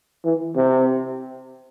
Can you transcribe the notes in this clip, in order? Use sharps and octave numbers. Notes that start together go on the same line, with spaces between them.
E3
C3